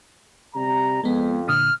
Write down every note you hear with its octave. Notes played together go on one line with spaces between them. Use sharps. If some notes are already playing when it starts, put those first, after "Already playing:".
C3 G3 A#5
F2 G#3 B3
A#2 D3 D#6 F6